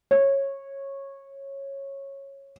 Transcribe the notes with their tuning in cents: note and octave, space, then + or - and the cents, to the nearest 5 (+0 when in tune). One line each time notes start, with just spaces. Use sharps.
C#5 -15